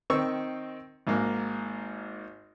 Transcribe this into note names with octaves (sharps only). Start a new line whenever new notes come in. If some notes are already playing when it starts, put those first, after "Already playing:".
D#3 C4 C#6 E6
G#1 G#2 A#3